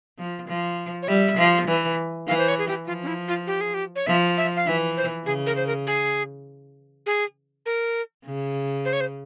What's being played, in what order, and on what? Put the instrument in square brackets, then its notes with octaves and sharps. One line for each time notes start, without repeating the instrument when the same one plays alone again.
[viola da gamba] F3
F3
[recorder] C#5
[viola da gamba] G3 [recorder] E5
[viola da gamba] F3
E3
[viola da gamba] E3 [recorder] F5
[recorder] C5
C#5
G#4
G4
[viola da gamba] F3 [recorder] F4
[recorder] C#4
E4
F4
G4
G#4
G4
C#5
[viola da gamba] F3 [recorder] E5
[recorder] E5
F5
[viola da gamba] E3 [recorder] E5
[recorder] C5
[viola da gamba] C#3 [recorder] G#4
[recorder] A#4
C5
A#4
G#4
G#4
A#4
[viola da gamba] C#3
[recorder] C5
C#5
C5